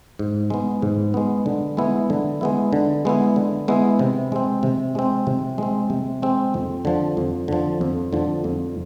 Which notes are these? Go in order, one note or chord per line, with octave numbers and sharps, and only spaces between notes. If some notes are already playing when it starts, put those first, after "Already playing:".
G#2
G#3 B3
G#2
G#3 B3
D3
G#3 B3 E4
D3
G#3 B3 E4
D3
G#3 B3 E4
D3
G#3 B3 E4
C3
G#3 C4
C3
G#3 C4
C3
G#3 C4
C3
G#3 C4
F2
D3 F3
F2
D3 F3
F2
D3 F3
F2